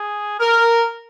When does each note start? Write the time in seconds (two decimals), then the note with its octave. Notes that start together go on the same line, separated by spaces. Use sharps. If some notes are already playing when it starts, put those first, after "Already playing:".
Already playing: G#4
0.40 A#4